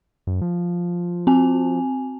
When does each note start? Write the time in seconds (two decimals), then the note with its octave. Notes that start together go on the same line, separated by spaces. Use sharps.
0.27 F#2
0.42 F3
1.27 C4 G#5